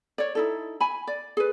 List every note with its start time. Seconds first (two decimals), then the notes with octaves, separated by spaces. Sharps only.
0.18 C#5 D5
0.35 D#4 E4 A4
0.80 G#5 B5
1.07 D5
1.37 G#4 B4